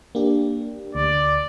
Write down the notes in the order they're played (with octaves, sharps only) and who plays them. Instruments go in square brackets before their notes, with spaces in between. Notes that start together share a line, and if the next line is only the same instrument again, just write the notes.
[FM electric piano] A#3 D4 G4
[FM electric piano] D2 [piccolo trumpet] D5